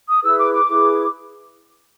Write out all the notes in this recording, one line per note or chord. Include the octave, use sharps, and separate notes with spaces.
D#6
E4 G#4 B4 E6
D6
D6
E4 G#4 B4